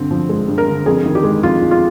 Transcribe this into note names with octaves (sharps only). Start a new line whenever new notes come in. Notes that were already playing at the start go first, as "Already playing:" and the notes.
Already playing: G2 D3 C4
F3
G#3
G2
A#4
D3
F2 G#4
D#3
G4
G#3
F2 F4
F2
F4